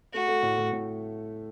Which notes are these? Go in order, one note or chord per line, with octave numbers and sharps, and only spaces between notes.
A3 F#4
A3
A2
A2
A2